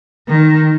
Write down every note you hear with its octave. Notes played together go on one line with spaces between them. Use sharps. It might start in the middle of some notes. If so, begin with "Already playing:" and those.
D#3